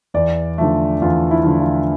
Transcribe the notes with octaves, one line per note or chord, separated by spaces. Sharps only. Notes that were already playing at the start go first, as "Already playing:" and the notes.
E2 D5
D3 F3 A3
E2 F4
E4
D3 F3 A3
F4